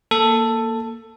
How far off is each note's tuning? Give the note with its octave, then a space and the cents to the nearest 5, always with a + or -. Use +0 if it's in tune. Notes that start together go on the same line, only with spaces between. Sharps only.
A#3 +0 A4 +10